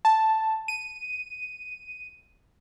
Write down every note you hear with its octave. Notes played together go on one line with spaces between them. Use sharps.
A5
D#7